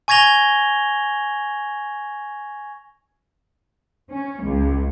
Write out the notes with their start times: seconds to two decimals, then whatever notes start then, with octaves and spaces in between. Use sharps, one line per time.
0.08 G#5 C#6 G#6 A#6 F7 G7
4.10 C#4
4.43 C#2